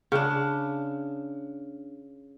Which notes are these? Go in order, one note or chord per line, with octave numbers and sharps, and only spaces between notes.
C#3 D4